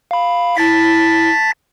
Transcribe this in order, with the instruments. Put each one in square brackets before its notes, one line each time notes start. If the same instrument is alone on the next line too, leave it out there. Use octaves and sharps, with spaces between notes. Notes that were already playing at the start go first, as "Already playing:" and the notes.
[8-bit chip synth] F5 B5
[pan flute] E4 [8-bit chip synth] A5 A6 B6